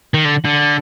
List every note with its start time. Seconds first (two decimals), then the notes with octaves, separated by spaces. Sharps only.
0.14 D#3
0.25 D3
0.45 D3